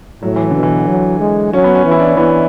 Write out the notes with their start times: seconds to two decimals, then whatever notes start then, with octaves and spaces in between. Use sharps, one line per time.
0.23 A2 F#3
0.36 E3
0.50 D3
0.56 B2
0.63 E3
0.88 F#3
1.20 G#3
1.53 F#3 C#4
1.64 B3
1.75 C#4
1.85 E3
1.91 E4
2.00 D4
2.08 C#4
2.17 E3 B3